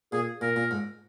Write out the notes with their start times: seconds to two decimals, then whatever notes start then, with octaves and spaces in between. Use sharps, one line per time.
0.12 A#2 G#4
0.41 A#2 A#4
0.56 A#2
0.71 G#2